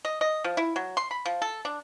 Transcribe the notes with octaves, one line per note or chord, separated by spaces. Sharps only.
D#5
D#5
F3
E4
F#3
C6
B5
F3
A4
D4